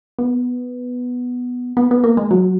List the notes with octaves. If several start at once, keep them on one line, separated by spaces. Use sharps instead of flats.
B3
B3
B3
A#3
G#3
F#3